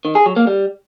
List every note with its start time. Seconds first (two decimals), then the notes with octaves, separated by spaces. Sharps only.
0.05 D#3
0.15 G#4
0.26 F#3
0.36 A#3
0.47 G3